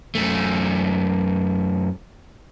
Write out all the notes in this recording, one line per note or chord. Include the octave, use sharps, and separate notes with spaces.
F#2 A3